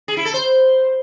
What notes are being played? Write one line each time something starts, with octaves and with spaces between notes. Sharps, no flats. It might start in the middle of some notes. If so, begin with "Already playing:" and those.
G#4
E4
A4
C5